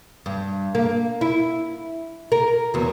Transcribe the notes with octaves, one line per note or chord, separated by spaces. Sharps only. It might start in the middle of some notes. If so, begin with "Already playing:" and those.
G2
A#3
E4
A#4
E2 F#3